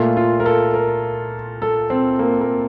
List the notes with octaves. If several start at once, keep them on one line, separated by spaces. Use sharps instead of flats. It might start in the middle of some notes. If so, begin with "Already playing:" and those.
Already playing: A#2 A3 F4
F4
A#4
A4
A#4
A4
C4
A#3
A#3